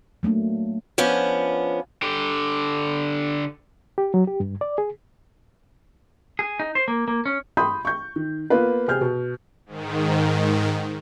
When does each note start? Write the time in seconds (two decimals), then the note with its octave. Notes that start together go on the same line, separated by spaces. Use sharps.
0.23 F#3 A3 A#3 D4
0.98 F3 B3 C#4 D4
2.03 D3 G4
3.98 G4
4.14 F#3
4.27 G4
4.40 G2
4.61 D5
4.78 G#4
6.39 G#4
6.59 D#4
6.75 C5
6.88 A#3
7.08 A#3
7.26 C#4
7.57 B5 C6 D#6 G6
7.85 C#6 G6
8.16 D#3
8.50 A#3 B3 F4 B4
8.88 C3 G#4 F6 G6
9.01 B2
9.66 G#2 D#3